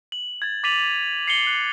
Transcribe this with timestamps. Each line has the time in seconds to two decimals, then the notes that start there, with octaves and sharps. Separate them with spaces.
0.12 F#7
0.42 G#6 A6
0.64 D6 A6 B6 D#7 F7 F#7
1.28 C7 C#7 G7
1.47 F#6